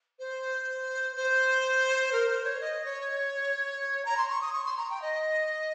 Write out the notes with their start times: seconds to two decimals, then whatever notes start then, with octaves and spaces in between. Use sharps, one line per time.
0.19 C5
1.16 C5
2.12 A#4
2.28 C5
2.44 C#5
2.61 D#5
2.85 C#5
4.05 A#5
4.17 C6
4.29 C#6
4.41 D#6
4.53 C#6
4.65 C6
4.77 A#5
4.90 G5
5.02 D#5